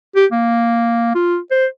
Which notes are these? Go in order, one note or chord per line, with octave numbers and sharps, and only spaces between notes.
G4
A#3
F4
C5